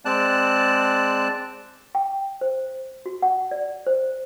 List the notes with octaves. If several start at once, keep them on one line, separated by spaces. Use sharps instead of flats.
G#3 C4 D5 A5 F#6
G5
C5
F#4
F#5
D5
C5